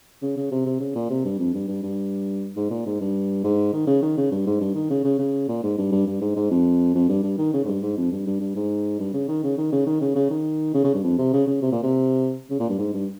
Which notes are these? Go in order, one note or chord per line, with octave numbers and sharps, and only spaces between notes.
C#3
C#3
C3
C3
C#3
A#2
C3
G2
F2
G2
G2
G2
G#2
A#2
G#2
G2
G#2
D#3
C#3
D#3
C#3
G2
G#2
G2
D#3
C#3
C#3
C#3
A#2
G#2
G2
G2
G2
G#2
G#2
F2
F2
G2
G2
D#3
C#3
G#2
G2
G#2
F2
G2
G2
G2
G#2
G2
C#3
D#3
C#3
D#3
C#3
D#3
C#3
C#3
D#3
C#3
C#3
G2
F2
C3
C#3
C#3
C3
A#2
C3
C#3
A#2
G2
G#2
G2